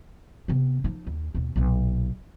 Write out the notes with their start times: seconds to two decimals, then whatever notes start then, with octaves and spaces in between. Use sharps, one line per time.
0.48 C3 B3
0.84 F3 D#4
1.07 D#2
1.35 D#2 B2
1.56 B1 A#2